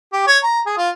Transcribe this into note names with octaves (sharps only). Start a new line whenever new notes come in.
G4
C#5
A#5
G#4
F4